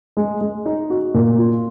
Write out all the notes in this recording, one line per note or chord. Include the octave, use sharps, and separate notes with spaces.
G#3
G#3
D#4
F#4
A#2
F4